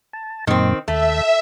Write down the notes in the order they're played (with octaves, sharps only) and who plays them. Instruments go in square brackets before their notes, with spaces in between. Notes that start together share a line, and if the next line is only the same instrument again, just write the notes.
[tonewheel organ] A5
[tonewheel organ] F#2 A#2 [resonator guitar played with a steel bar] D#3 C4
[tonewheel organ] D#2 [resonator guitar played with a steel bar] A3 [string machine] E5